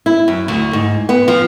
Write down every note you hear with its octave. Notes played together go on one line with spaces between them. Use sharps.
E4
F#2
D2
G#2
B3
F3